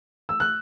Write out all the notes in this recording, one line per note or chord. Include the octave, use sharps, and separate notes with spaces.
E6
F#6